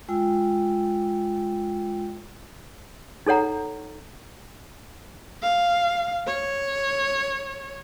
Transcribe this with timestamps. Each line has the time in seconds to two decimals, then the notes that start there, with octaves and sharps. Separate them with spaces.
0.09 G#3 F4 G5 E6
3.26 D#4 A4 C#5 F#5 A#5
5.42 F5
6.27 C#5